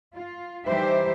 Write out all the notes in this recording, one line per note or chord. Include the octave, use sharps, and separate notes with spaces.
F4
E3 G3 D#4 G4 C5 E5